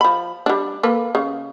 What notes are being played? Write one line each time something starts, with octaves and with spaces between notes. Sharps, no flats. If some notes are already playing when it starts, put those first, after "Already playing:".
F3 B5
G3 D4
A#3 A4 B4
C#3